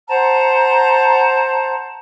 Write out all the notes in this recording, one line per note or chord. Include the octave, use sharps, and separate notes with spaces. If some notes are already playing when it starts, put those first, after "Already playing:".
C5 F#5 A5 A#5